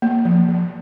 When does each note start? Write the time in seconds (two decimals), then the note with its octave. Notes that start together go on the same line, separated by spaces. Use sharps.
0.02 A#3
0.25 F3
0.48 F3